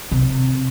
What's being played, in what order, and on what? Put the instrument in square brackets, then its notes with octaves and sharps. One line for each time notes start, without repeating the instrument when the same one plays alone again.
[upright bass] C3